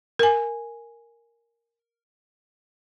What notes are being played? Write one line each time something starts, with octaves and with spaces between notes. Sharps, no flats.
A#4 G#5